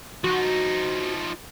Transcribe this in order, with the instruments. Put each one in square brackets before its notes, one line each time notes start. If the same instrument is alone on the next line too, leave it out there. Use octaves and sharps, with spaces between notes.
[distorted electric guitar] F3 D#4 [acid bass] F#4